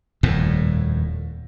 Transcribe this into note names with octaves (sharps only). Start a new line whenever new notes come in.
D#1 F2 A2